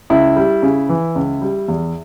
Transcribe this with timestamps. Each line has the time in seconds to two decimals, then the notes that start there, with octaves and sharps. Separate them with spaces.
0.10 C#2 E4
0.36 G3
0.62 C#3
0.89 E3
1.15 C#2
1.41 G3
1.68 E2